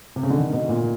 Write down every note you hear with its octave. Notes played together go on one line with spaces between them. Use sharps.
C3
C#3
D3
D#3
B2
A#2